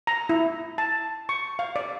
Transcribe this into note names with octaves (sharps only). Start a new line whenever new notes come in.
A#5
E4
A5
C#6
F5
D5